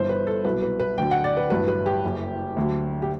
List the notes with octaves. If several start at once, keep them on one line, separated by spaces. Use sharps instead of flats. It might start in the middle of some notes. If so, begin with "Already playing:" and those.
Already playing: G1 G2 E3 C5
B4
A4
C2 B2 F#3 B4
B4
B4
D2 D3 F#3 G5
F#5
D5
B4
A1 G2 F#3 B4
B4
G4
F#1 F#2 F#3
D2 D3 F#3
G4